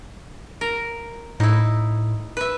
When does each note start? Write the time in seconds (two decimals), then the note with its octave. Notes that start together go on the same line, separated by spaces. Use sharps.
0.61 A#4
1.40 A2 D#4 E4
2.37 B4 E5